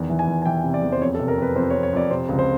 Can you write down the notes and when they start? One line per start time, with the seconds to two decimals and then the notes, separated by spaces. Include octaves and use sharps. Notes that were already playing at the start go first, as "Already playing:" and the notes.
Already playing: E2 D#3
0.10 E3
0.19 G#5
0.27 E2
0.42 G#5
0.46 E3 G5
0.64 C3
0.74 D5
0.82 E2
0.92 C5
1.01 F2 C#5
1.15 A4
1.19 C3
1.28 A#4
1.38 F2 B4
1.56 F2 C5
1.70 C#5
1.74 F2
1.83 C#5
1.93 F2 D5
2.11 C3 C5
2.29 C#2
2.39 C5